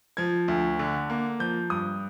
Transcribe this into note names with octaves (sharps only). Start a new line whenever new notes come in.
F3 G#6
D2
D3
A#3
F3 G6
G2 D#6